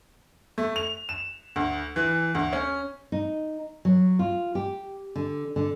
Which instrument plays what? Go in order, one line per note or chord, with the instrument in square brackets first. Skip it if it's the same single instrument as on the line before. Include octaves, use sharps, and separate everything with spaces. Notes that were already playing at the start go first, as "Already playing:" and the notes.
[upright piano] A3
F7
E7
D2
E3
D2
C#4
[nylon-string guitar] D#4
F#3
F4
G4
D3
D3